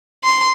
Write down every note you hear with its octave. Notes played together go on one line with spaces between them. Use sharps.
C6